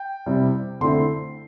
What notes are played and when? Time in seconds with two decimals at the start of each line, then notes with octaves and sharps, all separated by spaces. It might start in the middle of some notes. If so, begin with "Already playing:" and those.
Already playing: G5
0.26 C3 G3 C4 E4
0.81 D3 A3 C4 E4 C6